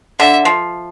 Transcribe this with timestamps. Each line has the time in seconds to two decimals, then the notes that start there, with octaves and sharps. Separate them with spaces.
0.19 D3 E5
0.45 F3